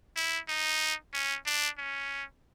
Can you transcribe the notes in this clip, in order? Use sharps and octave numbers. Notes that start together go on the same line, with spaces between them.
E4
D#4
C#4
D4
C#4